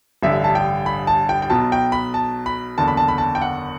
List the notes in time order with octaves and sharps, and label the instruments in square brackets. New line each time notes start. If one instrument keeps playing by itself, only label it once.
[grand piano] A1 G2 D3 E5
A5
G5
B5
A5
G5
G5
B1 B2 A5
G5
B5
A5
B5
F#1 E2 D3 A5
B5
A5
B5
A5
G5
F#5